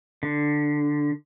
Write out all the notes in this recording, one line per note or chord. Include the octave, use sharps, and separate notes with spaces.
D3